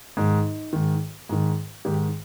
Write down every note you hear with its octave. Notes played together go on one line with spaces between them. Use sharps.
G#2 D#3 D#4
G#2 D#3
G#2 D#3
G#2 D#3 G4